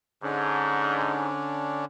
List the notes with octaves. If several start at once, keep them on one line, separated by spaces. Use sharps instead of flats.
G#2 D3 C#4 D4